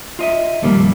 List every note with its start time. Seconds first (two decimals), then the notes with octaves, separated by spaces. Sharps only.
0.19 F4 D#5 E5
0.62 F2 A#2 D#3 G3 A#3